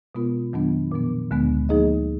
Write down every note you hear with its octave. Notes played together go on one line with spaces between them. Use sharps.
B2 G#3 B3 F4 A#4
F2 D#3 F#3 B3 D4
A#2 F3 B3
D2 D3 G#3 B3
F3 A#3 D#4 G#4 D#5